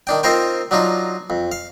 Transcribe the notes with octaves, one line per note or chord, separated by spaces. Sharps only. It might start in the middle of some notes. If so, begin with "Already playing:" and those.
D#3 D4 G5
C4 D#4 F4 A#4 C5 G5
F#3 D4 D#4 F4
F2
F5